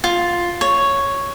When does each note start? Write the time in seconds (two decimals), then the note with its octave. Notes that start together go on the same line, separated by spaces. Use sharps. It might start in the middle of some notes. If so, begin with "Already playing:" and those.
0.04 F4
0.61 C#5